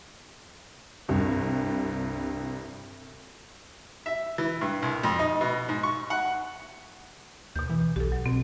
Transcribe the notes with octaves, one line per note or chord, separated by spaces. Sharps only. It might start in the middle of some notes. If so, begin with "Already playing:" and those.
C2 G2
E5
E3
G2
C2
F2
D#4
B2
G#2
C#6
F#5
D#2 B2 G6
E3
B1 G4 A4
F#3
B2 C4